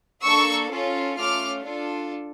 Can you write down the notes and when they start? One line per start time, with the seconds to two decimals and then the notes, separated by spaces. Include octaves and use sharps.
0.23 A#3 D4 A4 C#6 E6
0.71 C#4 F4 A4
1.18 A3 C#4 F4 D6 F6
1.64 D4 F4 A4